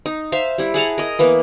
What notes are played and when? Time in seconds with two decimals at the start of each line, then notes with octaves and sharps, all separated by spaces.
0.06 D#4
0.32 C5 E5 F5
0.58 G3 E4
0.74 G#4 F#5 A5 A#5
0.98 A#4 D#5
1.19 E3 A#3 B3